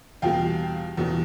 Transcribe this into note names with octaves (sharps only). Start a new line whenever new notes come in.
E2 B2 G3 F5 G5
E2 B2 G3